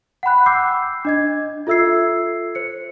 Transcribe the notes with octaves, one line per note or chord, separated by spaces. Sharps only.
F#5 G5 B5 F#6
D6 E6 G6 C7
D4 D#5 G#6
F4 A4 E5 E6 G#6 C7
C5 C#7